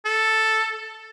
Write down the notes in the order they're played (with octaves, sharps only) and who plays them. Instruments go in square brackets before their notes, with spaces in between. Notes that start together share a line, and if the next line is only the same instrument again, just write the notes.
[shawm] A4